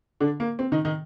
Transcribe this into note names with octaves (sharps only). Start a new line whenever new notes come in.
D3 D4
A#3
C4
D#3 D#4
D#3 D#4